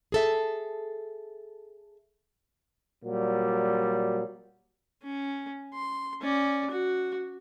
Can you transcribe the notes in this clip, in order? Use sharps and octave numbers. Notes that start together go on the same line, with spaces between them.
G#4 A4 E5
A#2 F#3 G3
C#4
C6
C#4 D5
F#4